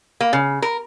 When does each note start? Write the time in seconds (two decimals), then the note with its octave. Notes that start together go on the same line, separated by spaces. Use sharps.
0.21 A#3
0.33 C#3
0.62 A#4